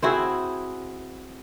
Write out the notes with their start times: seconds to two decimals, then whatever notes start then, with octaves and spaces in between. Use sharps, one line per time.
0.02 C4 E4 F#4 G#4